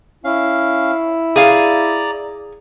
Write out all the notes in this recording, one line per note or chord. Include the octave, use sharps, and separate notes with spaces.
C#4 E4 F5
G#4 D5 F5 A#5